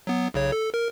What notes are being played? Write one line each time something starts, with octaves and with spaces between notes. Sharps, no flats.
F#3 B3
B1 C#3 C#5
A4
A#4